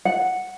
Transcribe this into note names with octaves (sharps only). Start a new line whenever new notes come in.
F#5